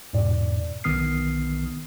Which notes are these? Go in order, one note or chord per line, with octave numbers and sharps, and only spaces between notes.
E2 G#2 B2 D5
B1 D#3 B3 D#6 F6 C7